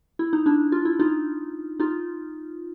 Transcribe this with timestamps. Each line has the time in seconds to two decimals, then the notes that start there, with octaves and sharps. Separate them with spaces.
0.19 E4
0.33 D#4
0.46 D4 E4
0.72 F4
0.85 E4
1.00 D#4 F4
1.80 D#4 F4